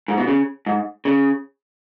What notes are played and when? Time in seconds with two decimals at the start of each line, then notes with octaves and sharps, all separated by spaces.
0.08 G#2
0.17 B2
0.27 C#3
0.66 G#2
1.05 C#3